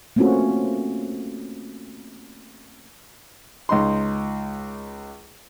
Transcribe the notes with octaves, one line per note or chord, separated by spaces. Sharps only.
A3 A#3 C4 C#4 F4 F#4
C#2 D#4 C6